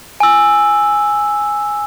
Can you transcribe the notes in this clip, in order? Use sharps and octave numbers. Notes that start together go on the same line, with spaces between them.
G#5 E6